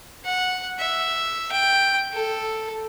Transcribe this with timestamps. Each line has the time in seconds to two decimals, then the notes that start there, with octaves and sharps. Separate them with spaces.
0.25 F#5
0.79 E5
1.52 G5
2.13 A4